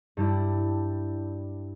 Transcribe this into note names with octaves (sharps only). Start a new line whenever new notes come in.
G2 G3 D4 E4